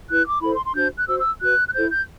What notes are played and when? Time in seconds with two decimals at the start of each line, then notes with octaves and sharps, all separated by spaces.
0.08 E4 B4 F#6
0.26 D6
0.41 E4 A4 C5 B5
0.53 C6
0.64 C6
0.75 D4 F#4 C5 G6
0.96 F#6
1.07 F#4 C5 E6
1.18 E6
1.41 F#4 B4 F#6
1.66 F#6
1.74 E4 A4 C5 G6
1.90 G6